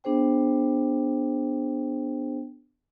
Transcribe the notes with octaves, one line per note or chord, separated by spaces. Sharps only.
B3 D4 G#4 C5 G5